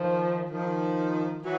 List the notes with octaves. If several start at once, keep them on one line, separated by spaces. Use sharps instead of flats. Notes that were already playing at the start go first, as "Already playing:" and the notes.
Already playing: D#3 F3
D#3 F3
E3 F#3